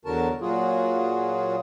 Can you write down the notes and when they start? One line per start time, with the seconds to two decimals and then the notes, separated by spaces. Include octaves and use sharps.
0.05 E2 D3 F#3 F#4 A#4 A5
0.41 A#2 F#3 F4 F#4 G#4